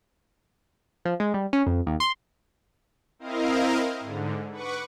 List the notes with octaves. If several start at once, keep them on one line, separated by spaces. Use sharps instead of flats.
F3
G#3
G3
C#4
F2
D#2
C6
C4 E4 A#4 D#5 F5
G#2 D3
B4 F#5 C#6 D6